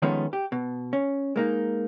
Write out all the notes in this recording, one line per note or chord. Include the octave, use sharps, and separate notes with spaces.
D#3 F3 G#3 A3 B3 C#4
G4
B2
C#4
G#3 A#3 D#4